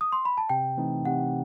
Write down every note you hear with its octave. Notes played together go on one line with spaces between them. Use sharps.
D#6
C6
B5
A5
C3 G5
E3 A3 C4 D#4
C3 F#5